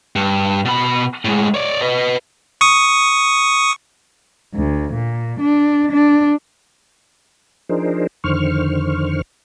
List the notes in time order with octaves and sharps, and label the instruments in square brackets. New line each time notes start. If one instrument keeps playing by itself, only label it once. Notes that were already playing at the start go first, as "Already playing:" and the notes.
[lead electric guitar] G2
B2 B5
A2 G#3
C#5 D5
B4 D#5
[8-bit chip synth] C#6 D#6
[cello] D2
A#2
D4
D4
[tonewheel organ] F3 D4 D#4 G#4 A#4 C5
F2 D3 D#3 C5 C#6 F6